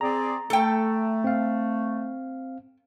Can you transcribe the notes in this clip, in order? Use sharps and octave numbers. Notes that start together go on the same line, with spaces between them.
C4 G#4 D5 A#5
A3 A4 G5
C4 F5